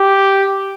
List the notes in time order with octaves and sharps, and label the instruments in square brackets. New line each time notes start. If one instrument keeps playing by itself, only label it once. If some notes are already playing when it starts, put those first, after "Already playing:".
Already playing: [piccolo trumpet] G4